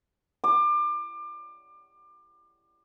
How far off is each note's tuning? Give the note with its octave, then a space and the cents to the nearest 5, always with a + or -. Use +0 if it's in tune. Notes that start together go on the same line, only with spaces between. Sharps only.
D6 +30